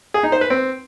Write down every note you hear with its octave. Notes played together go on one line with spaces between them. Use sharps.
G#4
D#4
C5
B4
C4